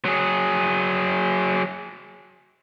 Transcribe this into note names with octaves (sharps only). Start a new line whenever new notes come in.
F#3 G#4